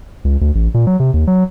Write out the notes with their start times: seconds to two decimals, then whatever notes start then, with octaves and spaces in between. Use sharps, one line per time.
0.25 C#2
0.41 D2
0.55 A1
0.74 A#2
0.87 F#3
1.00 C3
1.14 D#2
1.27 F#3